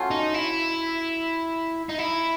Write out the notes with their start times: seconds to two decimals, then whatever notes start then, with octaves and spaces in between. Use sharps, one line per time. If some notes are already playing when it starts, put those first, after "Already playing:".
Already playing: F#3 A3 C#4 F4
0.11 D#4
0.34 E4
1.89 D#4
1.99 E4